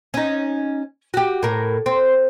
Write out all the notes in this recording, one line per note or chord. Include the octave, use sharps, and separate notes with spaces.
C#4 D#4
F#4 G4
A2 A#4
C4